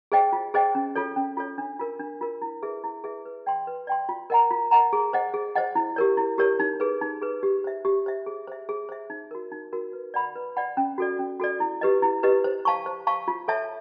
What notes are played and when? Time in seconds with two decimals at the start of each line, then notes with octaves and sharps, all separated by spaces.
0.12 G#4 C5 D#5 G5
0.32 F4
0.54 G#4 C5 D#5 G5
0.75 C#4
0.95 F4 A4 C#5
1.16 C#4
1.37 F4 A4 C#5
1.58 D4
1.79 F4 A#4
1.99 D4
2.21 F4 A#4
2.42 E4
2.62 G#4 B4 E5
2.84 E4
3.04 G#4 B4 E5
3.25 B4
3.46 D5 G5 C6
3.67 B4
3.87 D5 G5 C6
4.09 F4
4.30 A#4 D#5 F#5 A#5
4.51 F4
4.71 A#4 D#5 F#5 A#5
4.93 G#4
5.13 C5 D#5 F#5
5.34 G#4
5.55 C5 D#5 F#5
5.75 E4
5.96 G4 A#4 C#5
6.17 E4
6.38 G4 A#4 C#5
6.59 D#4
6.80 G#4 B4
7.01 D#4
7.22 G#4 B4
7.43 G4
7.64 C5 E5
7.85 G4
8.06 C5 E5
8.26 G#4
8.47 C5 E5
8.69 G#4
8.89 C5 E5
9.10 D#4
9.31 F#4 A#4
9.52 D#4
9.73 F#4 A#4
9.93 B4
10.14 D5 F#5 B5
10.35 B4
10.56 D5 F#5 B5
10.77 C#4
10.98 F#4 A4 D5
11.19 C#4
11.39 F#4 A4 D5
11.60 E4
11.81 G4 B4 D#5
12.02 E4
12.23 G4 B4 D#5
12.44 C5
12.65 F5 A5 C#6
12.86 C5
13.07 F5 A5 C#6
13.28 F4
13.48 A4 C#5 E5 A5